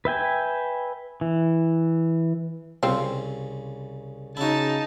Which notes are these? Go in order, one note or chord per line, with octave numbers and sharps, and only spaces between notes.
B4 E5 G5 G#5
E3
C2 C#3 C4 F4
C#3 D#4 E4 F#4 A5